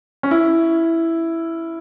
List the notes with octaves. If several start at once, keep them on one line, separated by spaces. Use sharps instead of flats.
C#4
E4